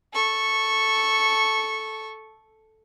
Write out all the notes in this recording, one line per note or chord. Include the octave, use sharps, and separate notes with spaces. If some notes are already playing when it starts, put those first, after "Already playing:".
A4 C#6